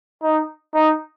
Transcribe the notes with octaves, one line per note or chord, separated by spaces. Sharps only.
D#4
D#4